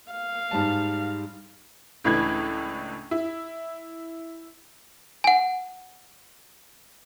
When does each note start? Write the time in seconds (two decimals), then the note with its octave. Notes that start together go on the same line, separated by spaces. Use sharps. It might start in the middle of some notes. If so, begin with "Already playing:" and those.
0.12 F5
0.51 G#2 G3 A5
2.04 C#2 A2 E3 D4 B5 G#6
3.11 E4
5.24 F#5 G#5